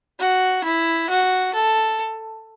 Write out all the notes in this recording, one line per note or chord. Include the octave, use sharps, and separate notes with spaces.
F#4
E4
F#4
A4